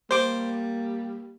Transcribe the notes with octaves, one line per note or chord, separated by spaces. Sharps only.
G3 A#3 C5 D6